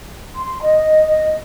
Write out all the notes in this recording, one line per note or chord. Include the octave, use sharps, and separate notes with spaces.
C6
D#5